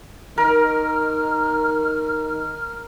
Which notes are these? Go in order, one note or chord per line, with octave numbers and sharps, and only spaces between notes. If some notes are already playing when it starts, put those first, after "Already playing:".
D#3 A#4 F6